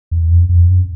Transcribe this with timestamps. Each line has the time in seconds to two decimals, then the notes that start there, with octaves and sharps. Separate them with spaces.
0.11 E2
0.31 F2
0.49 F2
0.68 F#2